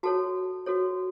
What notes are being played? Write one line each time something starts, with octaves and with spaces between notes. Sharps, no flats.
F#4 A4 C#5 A5
F#4 A4 C#5